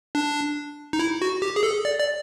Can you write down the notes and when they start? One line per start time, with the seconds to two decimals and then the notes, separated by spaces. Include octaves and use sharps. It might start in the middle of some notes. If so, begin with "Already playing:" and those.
0.15 D4
0.93 D#4
0.99 E4
1.22 F#4
1.42 G4
1.56 G#4
1.63 A4
1.85 D5
1.99 D5